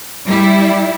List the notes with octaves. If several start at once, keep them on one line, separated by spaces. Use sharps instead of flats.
G3 E4